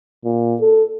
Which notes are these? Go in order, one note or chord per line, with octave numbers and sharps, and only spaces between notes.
A#2
A4